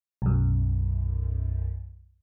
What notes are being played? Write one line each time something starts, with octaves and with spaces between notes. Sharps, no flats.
B1 F#2